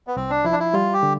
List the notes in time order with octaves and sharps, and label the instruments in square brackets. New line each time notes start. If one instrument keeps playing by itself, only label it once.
[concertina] B3
[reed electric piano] C2 [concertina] C4
[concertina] D4
[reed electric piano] F3 [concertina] E4
[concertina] D4
E4
[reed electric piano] G3 [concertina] F4
[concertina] G4
[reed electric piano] D3